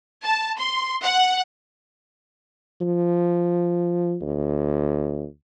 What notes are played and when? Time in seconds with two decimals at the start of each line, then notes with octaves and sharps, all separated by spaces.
0.23 A5
0.58 C6
1.03 F#5
2.81 F3
4.22 D2